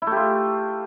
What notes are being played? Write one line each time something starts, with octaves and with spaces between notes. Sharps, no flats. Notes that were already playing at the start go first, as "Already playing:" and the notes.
A3 E4 F4 G4